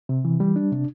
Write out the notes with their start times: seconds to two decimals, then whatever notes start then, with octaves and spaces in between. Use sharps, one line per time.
0.09 C3
0.25 E3
0.40 G3
0.56 D4
0.72 C3